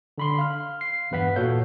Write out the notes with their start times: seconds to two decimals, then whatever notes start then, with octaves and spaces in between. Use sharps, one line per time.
0.18 D3 B5 C6
0.39 F5 F6
0.81 C7
1.11 E2 G2 B4 F#5 B6
1.36 A#2 F#4 A4 C#5 F5 G6